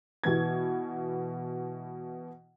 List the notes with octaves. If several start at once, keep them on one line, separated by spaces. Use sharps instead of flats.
B2 E3 B3 G#6